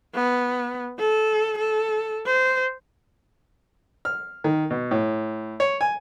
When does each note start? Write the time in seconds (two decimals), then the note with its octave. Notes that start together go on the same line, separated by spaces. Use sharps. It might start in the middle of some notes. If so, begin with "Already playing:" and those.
0.15 B3
0.99 A4
1.58 A4
2.26 C5
4.05 F6
4.44 D#3
4.70 B2
4.91 A2
5.60 C#5
5.81 G#5